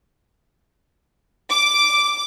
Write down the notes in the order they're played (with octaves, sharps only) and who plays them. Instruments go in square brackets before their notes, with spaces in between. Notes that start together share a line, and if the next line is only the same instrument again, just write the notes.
[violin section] D6